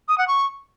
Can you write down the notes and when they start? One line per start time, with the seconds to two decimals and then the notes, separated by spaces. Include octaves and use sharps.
0.08 D#6
0.18 F#5
0.28 C#6